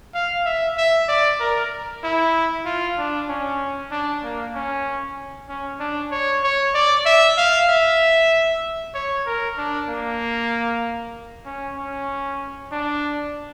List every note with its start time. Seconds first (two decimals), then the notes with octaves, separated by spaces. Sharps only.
0.14 F5
0.46 E5
0.78 E5
1.08 D5
1.40 A#4
2.03 E4
2.65 F4
2.98 D4
3.29 C#4
3.91 D4
4.23 A#3
4.55 C#4
5.49 C#4
5.80 D4
6.11 C#5
6.43 C#5
6.74 D5
7.06 E5
7.38 F5
7.69 E5
8.94 C#5
9.26 A#4
9.58 D4
9.89 A#3
11.45 C#4
11.77 C#4
12.72 D4